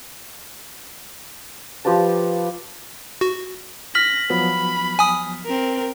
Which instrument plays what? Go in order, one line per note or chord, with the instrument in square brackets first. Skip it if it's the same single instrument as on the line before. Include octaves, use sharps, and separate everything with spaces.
[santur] F3 G4 B4 A5
[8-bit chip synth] F#4
[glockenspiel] F6 B6 F#7 [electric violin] A#6
[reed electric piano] F3 F#3 B3 [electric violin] B5
[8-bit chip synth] G#5 D#6
[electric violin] C4 A#4